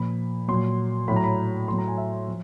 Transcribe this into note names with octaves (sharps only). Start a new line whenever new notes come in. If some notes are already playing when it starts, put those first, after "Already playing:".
Already playing: A#2 F3 B5
A#2 F#3 C6
A2 F#3 B5
A#5
B5
A2 F#3 C6
A#5
G#5
E5
F3